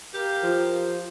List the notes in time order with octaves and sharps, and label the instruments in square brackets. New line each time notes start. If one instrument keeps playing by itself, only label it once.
[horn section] G4 A#4 F5
[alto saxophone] F3